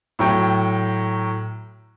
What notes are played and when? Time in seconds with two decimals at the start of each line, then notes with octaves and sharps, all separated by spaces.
0.19 A2 F#3 G5